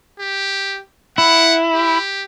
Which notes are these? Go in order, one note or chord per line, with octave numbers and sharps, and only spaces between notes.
G4
E4 F#5
G4